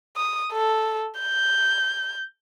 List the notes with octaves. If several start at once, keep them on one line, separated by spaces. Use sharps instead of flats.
D#6
A4
G6